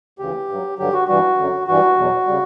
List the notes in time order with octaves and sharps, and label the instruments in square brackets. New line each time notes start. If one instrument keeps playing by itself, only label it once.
[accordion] D2 C#3 E3 G4
G2 F#3
G2 D3 F#3 G4
F#4
G2 E3 G3 F#4
F#2 D3 F#3
G2 E3 G3 F#4
E2 B2 F#3
C#3 G3